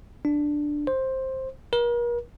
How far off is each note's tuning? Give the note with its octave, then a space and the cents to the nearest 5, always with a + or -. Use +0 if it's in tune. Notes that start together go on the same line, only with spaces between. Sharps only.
D4 +5
C5 +10
A#4 +40